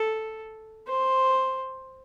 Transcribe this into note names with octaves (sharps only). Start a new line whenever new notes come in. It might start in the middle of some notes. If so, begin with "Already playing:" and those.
Already playing: A4
C5